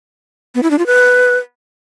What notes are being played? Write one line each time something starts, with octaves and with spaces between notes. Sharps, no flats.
B3
E4
D4
F4
B4